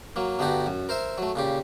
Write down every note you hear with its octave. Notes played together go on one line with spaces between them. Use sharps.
F#3 A#3
G2 D3 B3 D#4 F#4 G4
F#2
A#4 C5 E5
F#3 A3
A#2 C#3 G4